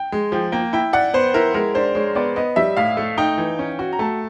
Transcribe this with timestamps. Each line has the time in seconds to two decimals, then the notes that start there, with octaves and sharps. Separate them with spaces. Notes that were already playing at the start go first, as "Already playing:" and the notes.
Already playing: G5
0.12 G#3
0.32 F3 G5
0.52 A#3 G5
0.73 E4 G5
0.93 D5 F#5
1.14 B3 C5
1.34 E4 A#4
1.54 G#3 A#4
1.75 D4 C5
1.95 G#3 C#5
2.15 B3 D5
2.36 B3 D#5
2.56 G3 E5
2.77 A2 F5
2.97 A3
3.18 D#4 G5
3.38 E3
3.59 C#4
3.79 F#4
3.93 A#5
3.99 A3 A5